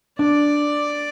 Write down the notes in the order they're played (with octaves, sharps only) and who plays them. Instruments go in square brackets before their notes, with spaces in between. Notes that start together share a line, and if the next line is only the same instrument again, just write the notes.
[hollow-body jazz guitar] D4 [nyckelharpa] D5